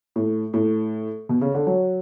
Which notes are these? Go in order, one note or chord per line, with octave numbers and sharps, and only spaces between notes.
A2
A2
B2
C#3
D3
F#3